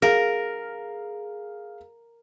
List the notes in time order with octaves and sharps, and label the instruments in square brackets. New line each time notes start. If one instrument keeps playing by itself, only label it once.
[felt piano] G#4 F5 [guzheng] A#4